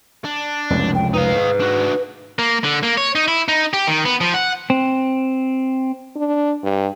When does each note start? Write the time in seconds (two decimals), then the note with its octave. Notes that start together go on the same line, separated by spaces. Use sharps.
0.25 D4
0.70 F1 C#2 F#2
0.95 G5
1.14 D#4 B4 F5
1.35 G#2
1.60 D4 F#4
2.39 A#3
2.64 D3
2.83 A#3
2.98 C#5
3.15 D#4
3.28 E4
3.48 D#4
3.73 G4
3.87 D#3
4.05 B3
4.21 F3
4.34 F#5
4.70 C4
6.16 D4
6.64 G2